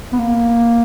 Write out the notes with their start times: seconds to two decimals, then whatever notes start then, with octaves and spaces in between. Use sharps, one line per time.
0.13 B3
0.19 A#3